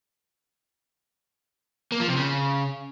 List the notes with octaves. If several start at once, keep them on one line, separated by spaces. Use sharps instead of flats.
A#3
F3
C3
C#3